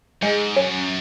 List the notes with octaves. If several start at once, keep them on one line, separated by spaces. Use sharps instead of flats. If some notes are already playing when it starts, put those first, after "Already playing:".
G#2 G#3
F#2 C#4